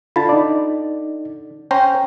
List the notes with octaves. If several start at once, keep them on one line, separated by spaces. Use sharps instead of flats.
D3 F4 A5 B5
D#4 D5
C#4 C5 G5 A#5